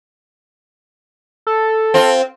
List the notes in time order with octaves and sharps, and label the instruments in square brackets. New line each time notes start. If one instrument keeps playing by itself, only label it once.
[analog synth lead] A4
[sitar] C4 F4